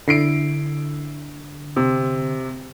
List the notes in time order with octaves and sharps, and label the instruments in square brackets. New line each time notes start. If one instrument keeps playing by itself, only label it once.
[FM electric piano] D3 [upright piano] E4 C7 D7
[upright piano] C3